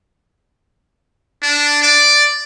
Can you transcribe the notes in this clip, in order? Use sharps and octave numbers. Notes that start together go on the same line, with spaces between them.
D4
D5